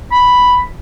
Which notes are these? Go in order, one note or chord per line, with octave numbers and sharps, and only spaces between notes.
B5